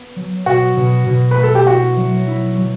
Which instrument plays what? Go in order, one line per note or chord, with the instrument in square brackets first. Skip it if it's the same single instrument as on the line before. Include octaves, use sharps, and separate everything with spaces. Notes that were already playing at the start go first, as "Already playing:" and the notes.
Already playing: [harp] B3
F#3
[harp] B2 [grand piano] F#4
[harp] B2
B2
[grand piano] B4
[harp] A3
[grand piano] A4
G4
[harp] E4 [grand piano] F#4
[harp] F#3
E4
F#3